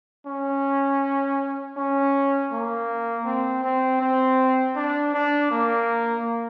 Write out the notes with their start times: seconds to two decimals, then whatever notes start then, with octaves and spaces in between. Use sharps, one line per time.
0.26 C#4
1.77 C#4
2.52 A#3
3.26 C4
3.64 C4
4.01 C4
4.76 D4
5.14 D4
5.51 A#3